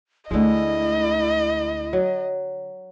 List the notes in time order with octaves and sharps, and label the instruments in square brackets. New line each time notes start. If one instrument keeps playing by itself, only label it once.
[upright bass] D2 A3 [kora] D3 G#3 [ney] E4 [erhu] D#5
[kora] F#3